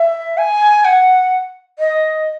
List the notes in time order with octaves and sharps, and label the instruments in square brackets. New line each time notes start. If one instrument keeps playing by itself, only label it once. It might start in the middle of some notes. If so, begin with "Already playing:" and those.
Already playing: [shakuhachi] E5
G#5
F#5
D#5